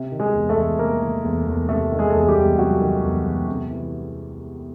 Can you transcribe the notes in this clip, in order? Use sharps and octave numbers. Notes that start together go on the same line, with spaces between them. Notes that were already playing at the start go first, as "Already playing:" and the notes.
Already playing: C3
D#3
G#3 G#4
E2
A3 A4
E2
C3 A#3 A#4
D#3
E2
E2
C3 A3 A4
D#3
G#3 G#4
E2 A4
G#4
G3 G4
E2
C3 F#3 F#4
D#3
E2
E2
C3
E3